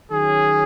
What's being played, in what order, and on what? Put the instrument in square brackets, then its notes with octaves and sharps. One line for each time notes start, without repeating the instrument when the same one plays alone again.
[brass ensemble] D#3 F#3 C#4 G#4